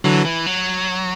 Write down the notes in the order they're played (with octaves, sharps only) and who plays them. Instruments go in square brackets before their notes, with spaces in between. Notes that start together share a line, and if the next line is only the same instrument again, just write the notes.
[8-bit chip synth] D3 F#3 [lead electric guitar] E3
[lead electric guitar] E3
F#3